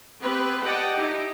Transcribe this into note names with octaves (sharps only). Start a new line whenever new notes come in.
B3 C4 G4 B4
G4 D5 D#5 F#5 G5 A5
D#4 E4 G4